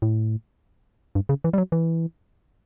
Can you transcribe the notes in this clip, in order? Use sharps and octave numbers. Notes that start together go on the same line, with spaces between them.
A2
G2
C#3
E3
G3
F#3
E3